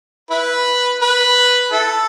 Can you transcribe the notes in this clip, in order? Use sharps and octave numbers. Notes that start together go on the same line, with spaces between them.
E4 B4
B4
E4 A4